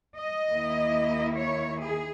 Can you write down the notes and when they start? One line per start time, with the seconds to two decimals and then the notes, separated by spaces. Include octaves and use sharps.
0.18 D#5
0.48 D#2 D#3 A#3 E4
1.38 C#5
1.83 G#4